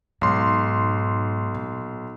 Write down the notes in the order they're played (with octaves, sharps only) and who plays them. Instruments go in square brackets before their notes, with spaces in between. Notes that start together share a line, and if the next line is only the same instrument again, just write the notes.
[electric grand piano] B1 C6 [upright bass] G#2
[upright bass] A#2